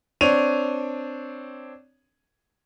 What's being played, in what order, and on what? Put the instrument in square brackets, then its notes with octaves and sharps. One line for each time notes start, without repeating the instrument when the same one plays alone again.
[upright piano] C4 D4 C#5 D#7 F7